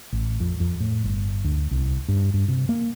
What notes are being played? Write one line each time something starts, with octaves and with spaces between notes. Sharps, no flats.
A1
F2
F2
A2
G1
D2
C2
G2
G2
C3
A#3